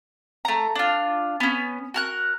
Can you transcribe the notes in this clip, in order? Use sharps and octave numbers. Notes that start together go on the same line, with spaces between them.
A3 A#5
D4 F4
B3 C#4
F#4 A#4 F#6